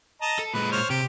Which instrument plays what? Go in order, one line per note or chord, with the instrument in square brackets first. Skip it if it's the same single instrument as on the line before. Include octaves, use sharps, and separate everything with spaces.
[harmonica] D#5 A5 A#5
[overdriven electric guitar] A4
[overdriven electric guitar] A#2 G#3 [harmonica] B4
[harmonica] C5 C#5 F6
[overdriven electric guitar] C3 [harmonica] G4